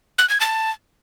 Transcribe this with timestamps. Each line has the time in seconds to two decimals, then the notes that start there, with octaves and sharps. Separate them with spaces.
0.18 F#6
0.29 G#6
0.40 A5